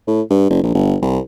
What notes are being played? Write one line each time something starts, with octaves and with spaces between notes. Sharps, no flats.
A2
G2
F#1
A#1
G1
C2